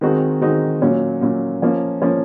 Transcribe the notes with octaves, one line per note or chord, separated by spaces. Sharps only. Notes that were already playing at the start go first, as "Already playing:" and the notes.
D#3 G#3 C4 D#4 F#4
D#3 G#3 C4 D#4 F#4
A#2 F#3 C#4
A#2 F#3 C#4
F3 A#3 C#4
F3 A#3 C#4